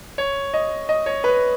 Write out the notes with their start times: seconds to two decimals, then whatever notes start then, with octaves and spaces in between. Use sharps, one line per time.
0.18 C#5
0.54 D#5
0.89 D#5
1.06 C#5
1.24 B4